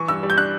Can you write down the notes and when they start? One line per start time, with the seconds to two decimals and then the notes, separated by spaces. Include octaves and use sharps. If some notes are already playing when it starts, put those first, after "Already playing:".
Already playing: E3 C#6
0.08 G2 E6
0.23 G3
0.30 G6
0.37 D4 F#6